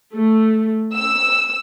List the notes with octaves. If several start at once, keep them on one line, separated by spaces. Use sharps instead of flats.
A3
E6